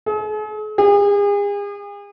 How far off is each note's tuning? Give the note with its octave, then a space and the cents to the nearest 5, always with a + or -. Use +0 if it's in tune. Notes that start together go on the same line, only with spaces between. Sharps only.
G#4 +45
G#4 -40